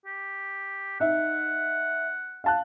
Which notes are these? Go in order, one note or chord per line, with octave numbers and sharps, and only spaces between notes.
G4
D#4 E5 F#5
F5 A5 F#6